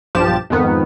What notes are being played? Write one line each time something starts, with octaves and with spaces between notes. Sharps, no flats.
B1 G2 F3 G4 A5 E7
F2 G#2 D#3 B3